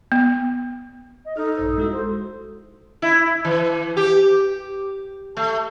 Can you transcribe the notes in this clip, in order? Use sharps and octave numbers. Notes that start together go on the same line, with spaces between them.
B3
D#5
D#4 A4 F6
A#1 G2 C5
G#3 E4 F#4
C5
E4
E3
G4
A3